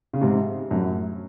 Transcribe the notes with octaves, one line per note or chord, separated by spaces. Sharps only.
C#3
G#2 C3
F#2 A2